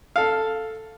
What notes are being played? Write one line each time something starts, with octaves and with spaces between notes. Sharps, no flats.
A4 F5